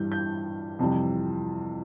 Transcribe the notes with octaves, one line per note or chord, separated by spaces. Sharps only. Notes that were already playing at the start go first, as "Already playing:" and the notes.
Already playing: G2 E3 G3 G6
G6
F2 C3 E3 G3